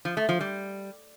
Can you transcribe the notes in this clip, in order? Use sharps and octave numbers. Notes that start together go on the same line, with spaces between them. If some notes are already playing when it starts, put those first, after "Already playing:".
F3
A3
F3
G3